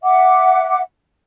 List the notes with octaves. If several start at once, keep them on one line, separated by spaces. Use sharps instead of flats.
E5 F#5 D6